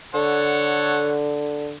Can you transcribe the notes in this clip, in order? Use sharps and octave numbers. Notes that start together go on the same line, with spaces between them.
D3 A4 C#5 F#5